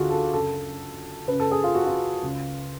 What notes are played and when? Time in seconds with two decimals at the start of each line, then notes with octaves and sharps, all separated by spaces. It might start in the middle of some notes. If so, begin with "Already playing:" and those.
Already playing: D2 D3 D4 F4 F#4 G#4
0.10 A4
0.33 F#2 C#3 A4
1.28 F#2 C#3 B4
1.40 A4
1.51 G#4
1.64 F4
1.75 F#4
1.86 F4
2.23 C#2 C#3